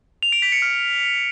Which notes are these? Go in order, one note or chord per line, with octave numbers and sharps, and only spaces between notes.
F7
D7
B6
C#7
F6